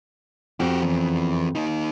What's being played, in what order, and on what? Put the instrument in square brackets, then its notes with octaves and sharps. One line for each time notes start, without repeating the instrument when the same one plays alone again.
[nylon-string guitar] F2 [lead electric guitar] F#4 G4
[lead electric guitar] E2
A#3 D#4